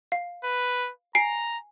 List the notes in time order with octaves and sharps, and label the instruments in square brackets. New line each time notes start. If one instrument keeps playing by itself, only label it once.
[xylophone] F5
[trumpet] B4
[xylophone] G#5 C7 D7 [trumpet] A#5